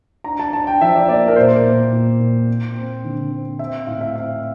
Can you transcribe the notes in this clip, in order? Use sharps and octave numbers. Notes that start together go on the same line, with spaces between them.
D4 A#5
A5
D4 A5
G5
F3 E5
D5
A#3 D5
A#4
A#2 C5
A#2
A#2
A#2
C4
C4
D3
C4
C4 E5
A2 F5
E5
C4 F5